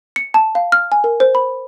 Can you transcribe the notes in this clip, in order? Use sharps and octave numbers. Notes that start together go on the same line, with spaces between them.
C#7
A5
F5
F6
G#5
A#4
C5
B5